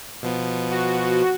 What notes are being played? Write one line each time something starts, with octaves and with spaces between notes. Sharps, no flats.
B2 F3 B3
F#4